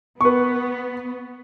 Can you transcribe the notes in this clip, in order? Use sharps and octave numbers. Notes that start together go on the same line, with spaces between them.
B3 B4 C#6